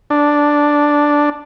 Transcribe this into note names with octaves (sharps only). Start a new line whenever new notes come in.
D4